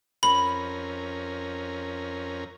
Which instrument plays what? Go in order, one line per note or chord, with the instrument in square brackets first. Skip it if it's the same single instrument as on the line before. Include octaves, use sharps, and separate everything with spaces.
[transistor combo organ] F2 C#4 A#4 [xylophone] B5